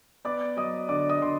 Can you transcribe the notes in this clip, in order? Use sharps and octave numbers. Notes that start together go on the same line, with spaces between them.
B3 D5 D6
F#3 D#5 D#6
D3 D5 D6
D#5 D#6
D3 C6